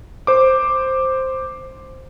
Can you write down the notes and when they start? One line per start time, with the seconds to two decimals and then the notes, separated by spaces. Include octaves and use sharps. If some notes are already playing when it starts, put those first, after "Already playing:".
0.27 C5 D6